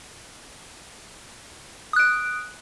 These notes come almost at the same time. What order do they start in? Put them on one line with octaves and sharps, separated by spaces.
D#6 F#6 D7